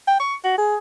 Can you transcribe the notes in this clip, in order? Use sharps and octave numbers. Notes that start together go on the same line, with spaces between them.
G5
C#6
F#4
G#4